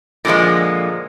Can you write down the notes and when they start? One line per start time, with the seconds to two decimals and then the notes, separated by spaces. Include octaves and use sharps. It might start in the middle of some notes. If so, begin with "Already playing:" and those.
0.25 A#2 D3 D#3 F3 G#3